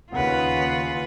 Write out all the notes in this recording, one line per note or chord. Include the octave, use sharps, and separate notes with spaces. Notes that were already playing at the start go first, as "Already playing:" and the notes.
D#2 C#3 F4 B4 F#5